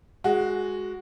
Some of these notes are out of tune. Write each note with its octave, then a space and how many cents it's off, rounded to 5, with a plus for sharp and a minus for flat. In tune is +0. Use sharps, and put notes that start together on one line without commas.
G#3 +0 F#4 +0